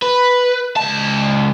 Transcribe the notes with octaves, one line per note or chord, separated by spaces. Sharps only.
B4
C#2 A5